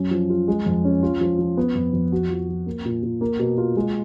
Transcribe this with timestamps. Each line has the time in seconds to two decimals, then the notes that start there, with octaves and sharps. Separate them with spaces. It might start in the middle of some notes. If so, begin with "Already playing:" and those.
Already playing: F#2 C#4
0.11 F3
0.30 F4
0.48 G#3
0.66 F2
0.84 C#4
1.03 F4
1.21 F3
1.39 F3
1.57 B3
1.75 F2
1.93 F2
2.12 F#4
2.29 F3
2.49 F3
2.66 A#3
2.85 A#2
3.03 A#2
3.21 A#3
3.39 B2
3.58 F4
3.76 G#3